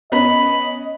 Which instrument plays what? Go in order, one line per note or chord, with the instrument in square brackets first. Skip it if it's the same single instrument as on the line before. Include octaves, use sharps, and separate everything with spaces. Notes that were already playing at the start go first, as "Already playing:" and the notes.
[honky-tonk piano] B3 C#4 [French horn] D#5 [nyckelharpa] B5